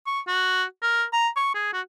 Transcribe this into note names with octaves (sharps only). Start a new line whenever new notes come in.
C#6
F#4
A#4
A#5
C#6
G#4
F#4